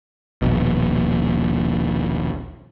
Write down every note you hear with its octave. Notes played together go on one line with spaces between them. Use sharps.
D#1 A#1 B2